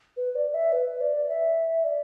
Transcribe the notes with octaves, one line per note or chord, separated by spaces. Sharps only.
B4
D5
E5
B4
D5
E5
D5